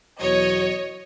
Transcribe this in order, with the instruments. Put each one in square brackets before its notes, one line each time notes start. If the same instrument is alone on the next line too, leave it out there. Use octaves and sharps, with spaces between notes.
[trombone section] E2 B2 F#3 [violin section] C#5 D#5